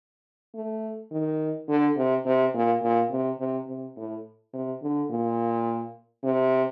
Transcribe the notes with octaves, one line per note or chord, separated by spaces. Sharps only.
A3
D#3
D3
C3
C3
A#2
A#2
C3
C3
C3
A2
C3
D3
A#2
C3